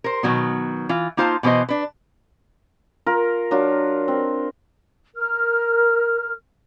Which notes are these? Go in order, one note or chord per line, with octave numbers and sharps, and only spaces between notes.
A#4 C5
B2 D#3 F#3 B3
E3 F4
A#3 D#4 F4 C5 G#5 A5
B2 E3 B3 C5 D#5
D4 B4
F4 A#4
F#3 D4 F4
C4
A#4 F6